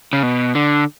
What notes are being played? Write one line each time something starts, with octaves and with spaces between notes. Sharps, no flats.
C#3
B2
D3